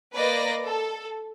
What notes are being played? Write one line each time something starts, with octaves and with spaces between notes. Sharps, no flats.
A#3 B4 D5 D#5 A#6
A4